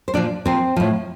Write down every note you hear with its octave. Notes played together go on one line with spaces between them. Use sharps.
C5
A#2 F3 D4 D5
A#2 F3 C4 C5
A2 F3